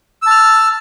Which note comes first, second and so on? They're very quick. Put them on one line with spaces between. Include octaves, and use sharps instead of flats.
E6 A5 F6